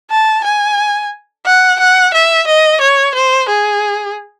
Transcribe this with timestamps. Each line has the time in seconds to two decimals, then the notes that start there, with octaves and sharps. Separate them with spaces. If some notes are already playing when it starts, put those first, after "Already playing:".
0.11 A5
0.44 G#5
1.46 F#5
1.80 F#5
2.14 E5
2.47 D#5
2.81 C#5
3.15 C5
3.49 G#4